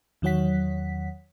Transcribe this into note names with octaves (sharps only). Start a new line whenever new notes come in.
E2 D#3 F#3 C#5 F#5 B6